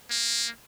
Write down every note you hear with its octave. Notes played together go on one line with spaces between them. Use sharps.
A#3